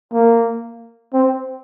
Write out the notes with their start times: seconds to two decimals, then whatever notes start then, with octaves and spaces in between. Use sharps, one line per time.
0.13 A#3
1.14 C4